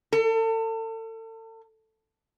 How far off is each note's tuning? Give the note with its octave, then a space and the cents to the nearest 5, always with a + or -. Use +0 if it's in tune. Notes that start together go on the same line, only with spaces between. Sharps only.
A4 +35